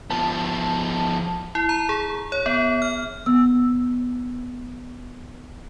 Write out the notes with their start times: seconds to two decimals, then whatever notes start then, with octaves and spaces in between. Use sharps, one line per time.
0.11 F3 B3 A5
1.55 E4
1.69 A#5
1.89 G#4
2.32 C#5
2.46 B3
2.82 F6
3.26 B3 E6